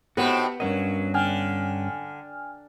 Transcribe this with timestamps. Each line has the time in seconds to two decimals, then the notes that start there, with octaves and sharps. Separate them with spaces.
0.17 A2 B3 C4 D#4 F#4 G4 B4
0.60 G2 F#3 C#4 A#4 D#5
1.14 D3 G5 G#5 F6